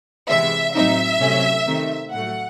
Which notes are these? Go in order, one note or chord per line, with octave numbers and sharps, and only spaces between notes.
C3 E3 G#3 E5
A2 F#3 C4 D#4 E5
C3 F#3 A3 C#4
C3 D#3 A3 C4 D#4
A2 F#3 A3 F#5